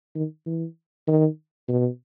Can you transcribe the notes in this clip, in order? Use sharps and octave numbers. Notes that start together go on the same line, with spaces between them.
D#3
E3
D#3
B2